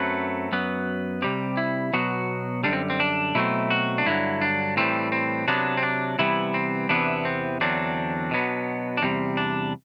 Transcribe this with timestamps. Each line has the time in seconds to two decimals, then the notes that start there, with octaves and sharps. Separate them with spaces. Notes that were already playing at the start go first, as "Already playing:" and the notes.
Already playing: F#2 F#3 A3 C4 B4
0.52 F#2 F#3 B3
1.22 C3 G3 C4 G4
1.57 E4
1.93 B2 F#3 B3 F#4
2.64 F#2 D3 G3 D4
2.73 C4
2.90 C4
3.00 D4
3.35 B2 F#3 A3 C4 E4
3.70 F#4
3.98 D4
4.06 G2 D3 F#3 E4
4.42 D4
4.77 A2 E3 G3 C4
5.12 C4
5.48 C3 F#3 B3 D4
5.77 C4
5.83 D4
6.19 C3 E3 G3 B3 E4
6.54 C4
6.89 E2 C3 E3 B3 D4
7.25 C4
7.61 E2 D3 F#3 C4 D4
8.31 B2 F#3 B3
8.97 D4
9.02 E2 C3 G3 C4
9.37 D4